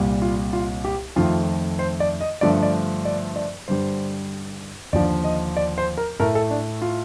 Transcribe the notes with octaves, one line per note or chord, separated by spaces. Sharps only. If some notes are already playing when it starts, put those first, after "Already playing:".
Already playing: C2 A#2 G3
F4
F4
G4
F2 D#3 A3 F4
C5
D5
D#5
G2 D3 F3 A3 D5
D5
D5
D5
G2 D3 G3 C5
D#2 D3 F3 D5
D#5
D5
C5
A#4
A2 A3 A#4
A4
D4
F4